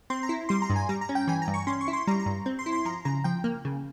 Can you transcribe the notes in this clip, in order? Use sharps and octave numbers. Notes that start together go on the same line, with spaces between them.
C4 C6
A#5
E4
G3 C6
A#5
G2
G#5
G3 A#5
A#5
C#4
G5
E3 G#5
A#5
G2
C#6
C#4 C6
C#6
E4
C6
G3 A#5
A#5
G2
C4
C6
E4
C6
F3 A#5
C#3 A#5
F3 G5
A#3
C#3